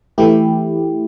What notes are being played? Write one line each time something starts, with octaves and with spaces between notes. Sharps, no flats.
E3 A3 E4 G4